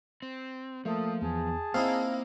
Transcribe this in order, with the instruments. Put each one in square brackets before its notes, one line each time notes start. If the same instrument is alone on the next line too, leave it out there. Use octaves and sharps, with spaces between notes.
[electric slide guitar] C4
[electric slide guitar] F3 [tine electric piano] A3 A#3 [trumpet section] A4 D#6
[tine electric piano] E2 [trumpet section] G#4 A5
[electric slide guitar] A#3 A#5 [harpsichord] C4 D#4 E4 [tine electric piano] F5